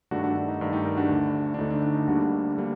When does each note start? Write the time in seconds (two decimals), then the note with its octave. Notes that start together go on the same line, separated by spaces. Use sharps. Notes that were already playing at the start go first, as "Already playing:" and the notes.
0.11 G2 D#3 A3 D4 F#4
0.23 D4 F#4
0.36 D4
0.48 D#4
0.61 G2 D#3 A3
0.73 D#4 G4
0.85 G4 A#4
0.97 D4 F#4
1.09 D2 D3 A3
1.54 D4
1.58 D2 D3 A3 D#4
1.70 D4
1.83 D4
1.95 D#4
2.07 D2 D3 G3 A#3 D4 F#4
2.57 D3 G3 A#3